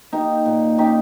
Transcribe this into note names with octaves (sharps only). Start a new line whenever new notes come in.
A#3 D#4 G4
A#2
C#4 D#4 G4